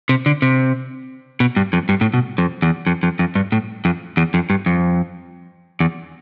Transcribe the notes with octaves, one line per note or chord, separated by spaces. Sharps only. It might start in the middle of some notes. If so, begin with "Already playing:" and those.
C3
D3
C3
B2
G2
F2
G2
A2
B2
F2
E2
F2
F2
F2
G2
A2
F2
E2
F2
G2
F2
E2